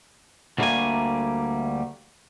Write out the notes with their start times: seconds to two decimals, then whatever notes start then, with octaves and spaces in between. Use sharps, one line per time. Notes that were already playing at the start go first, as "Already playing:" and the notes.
0.58 D2 A2 G3 A3 A#3 G#5